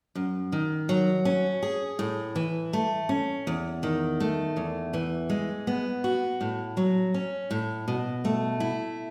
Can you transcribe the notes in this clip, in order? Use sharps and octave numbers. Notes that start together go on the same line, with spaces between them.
F#2
D#3
F#3
C#4
G#4
A2
E3
A3
C#4
E2
D#3
A3
E2
E3
G#3
B3
F#4
A2
F#3
C#4
A2
B2
A3
E4